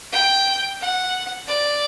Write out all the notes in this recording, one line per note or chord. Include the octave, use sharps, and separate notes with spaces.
G5
F#5
D5